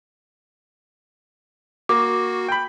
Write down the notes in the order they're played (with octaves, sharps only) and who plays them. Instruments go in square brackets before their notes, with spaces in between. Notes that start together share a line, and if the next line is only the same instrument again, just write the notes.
[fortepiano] A#3 [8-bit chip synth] F#4 [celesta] D6
[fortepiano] G5 B5